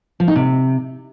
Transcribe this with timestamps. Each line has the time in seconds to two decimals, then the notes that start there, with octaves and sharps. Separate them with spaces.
0.20 F3
0.28 D#4
0.36 C3